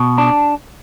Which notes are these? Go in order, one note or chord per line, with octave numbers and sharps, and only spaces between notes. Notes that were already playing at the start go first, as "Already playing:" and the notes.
Already playing: B2
D4